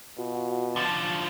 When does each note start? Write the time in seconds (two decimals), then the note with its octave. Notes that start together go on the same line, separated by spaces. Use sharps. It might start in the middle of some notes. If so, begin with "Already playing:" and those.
0.18 B2 F4 F#4
0.76 D3 F3 A5 C#6